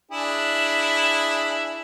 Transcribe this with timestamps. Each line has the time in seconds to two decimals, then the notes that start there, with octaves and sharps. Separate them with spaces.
0.11 D4 E4 G#4